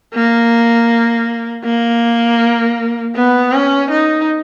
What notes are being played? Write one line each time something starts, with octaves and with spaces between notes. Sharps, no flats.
A#3
A#3
B3
C#4
D#4